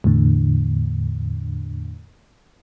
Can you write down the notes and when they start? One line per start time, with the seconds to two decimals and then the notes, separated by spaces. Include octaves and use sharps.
0.04 E2 A2 D3